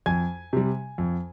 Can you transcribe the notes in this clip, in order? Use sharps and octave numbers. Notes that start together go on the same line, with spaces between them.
F2 G#5 G#6
C3 G3
F2